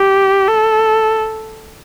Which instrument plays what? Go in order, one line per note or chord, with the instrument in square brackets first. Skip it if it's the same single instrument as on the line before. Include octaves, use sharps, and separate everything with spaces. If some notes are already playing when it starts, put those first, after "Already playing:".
Already playing: [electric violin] G4
A4